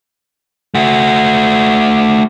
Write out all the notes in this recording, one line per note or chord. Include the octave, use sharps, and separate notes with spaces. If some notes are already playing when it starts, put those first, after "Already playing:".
A3 F#4